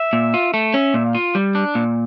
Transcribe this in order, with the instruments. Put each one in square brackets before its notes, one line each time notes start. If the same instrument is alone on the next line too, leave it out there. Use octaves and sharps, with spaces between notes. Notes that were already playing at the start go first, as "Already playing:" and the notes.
Already playing: [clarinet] E5
[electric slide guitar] A#2
F4
A3
[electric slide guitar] C#4 [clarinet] E5
[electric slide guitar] A#2
[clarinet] F5
[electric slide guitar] F4
G3
D4
A#2